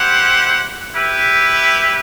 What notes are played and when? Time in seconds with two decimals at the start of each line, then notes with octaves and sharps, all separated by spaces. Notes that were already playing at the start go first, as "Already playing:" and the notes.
Already playing: E4 G4 C5 F#5
0.94 E4 G4 B4 E5